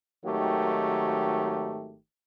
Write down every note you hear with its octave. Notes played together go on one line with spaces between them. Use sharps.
G#1 D#3 F#3 A3 G4